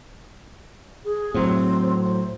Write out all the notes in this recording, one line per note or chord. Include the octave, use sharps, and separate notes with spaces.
G#4
A2 F#3 C4
C5